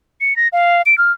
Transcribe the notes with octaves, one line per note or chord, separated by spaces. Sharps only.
C#7
A#6
F5
D7
F6